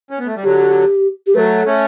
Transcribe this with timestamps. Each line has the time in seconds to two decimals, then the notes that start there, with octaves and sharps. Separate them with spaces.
0.10 C#4
0.19 B3
0.27 A3
0.36 G3
0.43 D3 F#3 G4
1.27 G4
1.35 F#3 A3 A4 B4
1.66 A3 C#4